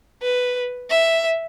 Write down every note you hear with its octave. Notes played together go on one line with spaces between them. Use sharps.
B4
E5